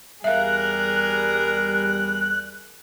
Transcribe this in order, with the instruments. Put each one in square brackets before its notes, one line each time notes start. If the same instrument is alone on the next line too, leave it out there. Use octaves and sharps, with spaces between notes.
[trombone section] E2 G3 [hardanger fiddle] G#4 A#4 [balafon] E5 F5 [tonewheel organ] F#6